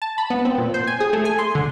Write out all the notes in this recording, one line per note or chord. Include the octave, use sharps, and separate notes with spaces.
A5
B5
B3
C4
A#2
C5
G#5
G#4
A3
G#5
C6
D3